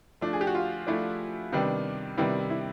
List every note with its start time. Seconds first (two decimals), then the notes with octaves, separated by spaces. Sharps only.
0.21 F3 A3 D4
0.33 G#4
0.41 G4
0.47 F#4
0.55 F4
0.87 F3 A3 D4 E4
1.52 C3 D#3 G3 B3 D4
2.18 C3 D#3 G3 B3 D4 E4
2.50 E4